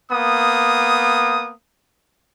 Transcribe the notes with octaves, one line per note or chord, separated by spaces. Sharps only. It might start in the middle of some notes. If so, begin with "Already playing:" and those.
A#3 B3 D#6